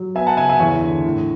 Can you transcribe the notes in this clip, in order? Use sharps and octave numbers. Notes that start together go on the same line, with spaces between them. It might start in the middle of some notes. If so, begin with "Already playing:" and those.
Already playing: F#3
B3 E5 G#5
F#5 A5
C#3 E5 G#5
E5 G#5
E2 C#5 E5
D3
A2